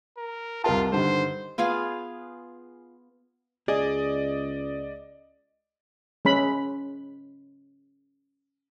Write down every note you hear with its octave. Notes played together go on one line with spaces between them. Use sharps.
A#4
C2 F4 A#4 A5
G2 D3 D#3 C5
B3 F4 G#4 F5
C#2 G#4 D5 D#5
G#3 C#4 B5